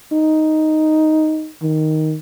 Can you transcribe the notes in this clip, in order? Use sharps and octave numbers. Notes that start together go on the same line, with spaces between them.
D#4
D#3